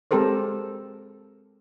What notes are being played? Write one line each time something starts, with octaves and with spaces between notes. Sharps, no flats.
G#3 C4 G4 A4 A#4 C5